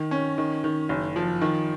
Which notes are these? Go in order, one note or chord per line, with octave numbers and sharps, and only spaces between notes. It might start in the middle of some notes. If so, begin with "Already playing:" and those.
Already playing: D#3
C#4
D#3
D#3
F#1
F3
D#3